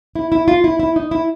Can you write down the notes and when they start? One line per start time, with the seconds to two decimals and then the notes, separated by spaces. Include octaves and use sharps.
0.15 E4
0.32 E4
0.48 F4
0.64 E4
0.80 E4
0.96 D#4
1.11 E4